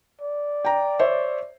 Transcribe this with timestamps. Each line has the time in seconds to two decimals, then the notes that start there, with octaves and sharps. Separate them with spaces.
0.21 D5
0.65 G5 A#5
0.99 C5 C#5 E5